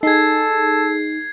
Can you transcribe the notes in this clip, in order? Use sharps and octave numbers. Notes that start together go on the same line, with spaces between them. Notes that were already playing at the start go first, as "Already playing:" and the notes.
D#4 G#4 A4 G#6 C7